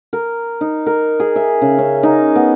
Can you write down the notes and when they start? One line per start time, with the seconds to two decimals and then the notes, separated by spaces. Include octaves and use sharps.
0.13 A#4
0.61 D#4
0.86 A#4
1.20 G#4
1.36 E5
1.62 C#3
1.78 C#4
2.03 D#4
2.36 B3